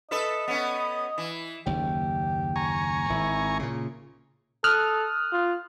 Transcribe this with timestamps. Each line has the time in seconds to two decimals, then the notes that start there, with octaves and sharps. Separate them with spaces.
0.11 A4 B4 D#5 E5
0.48 B3 C#4
1.18 E3
1.66 F#1 D#2 G4
2.56 G#5 A#5 C#6
3.10 G#1 E4
3.59 A#2 C#3
4.64 A4 D#6 F6 F#6
5.33 F4